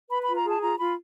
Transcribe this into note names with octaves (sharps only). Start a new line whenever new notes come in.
B4 B5
B5
F4
A#5
G#4
A5
F4 A#5
F4 B5